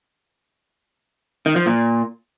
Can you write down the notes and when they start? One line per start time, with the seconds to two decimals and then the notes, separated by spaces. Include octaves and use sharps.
1.46 D#3
1.56 F3
1.66 A#2